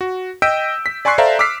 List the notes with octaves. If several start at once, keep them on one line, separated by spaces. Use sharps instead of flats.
F#4
D#5 G5 E6 G6 B6 D7
B6
D5 G#5 C6 C#6 F#6 C7
A4 C5 D5 E5 F5 A#5
D6 E6 F6 B6 C7